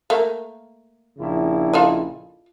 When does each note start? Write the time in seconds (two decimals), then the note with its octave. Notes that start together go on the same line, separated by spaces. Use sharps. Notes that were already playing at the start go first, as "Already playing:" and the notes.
0.10 A3 A#3
1.18 A#1 C#3 E4
1.73 F4 A4 D#5